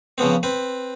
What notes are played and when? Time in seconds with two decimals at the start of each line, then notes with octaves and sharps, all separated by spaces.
0.18 C#3 F3 B3 C4
0.43 C4 B4